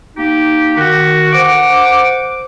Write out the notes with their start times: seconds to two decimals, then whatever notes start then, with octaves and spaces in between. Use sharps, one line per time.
0.16 A#3 D#4 G4
0.76 D#3 F#4
1.33 C5 F#5 D6